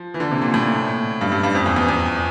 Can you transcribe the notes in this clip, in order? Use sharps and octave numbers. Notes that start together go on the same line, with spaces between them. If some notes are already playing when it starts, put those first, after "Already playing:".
Already playing: F3
E3
D3
C3
A#2
A2
G2
G2
G2
F2
E2
E2
E2